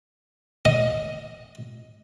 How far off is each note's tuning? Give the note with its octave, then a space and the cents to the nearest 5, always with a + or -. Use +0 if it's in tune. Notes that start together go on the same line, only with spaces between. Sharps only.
D#5 +10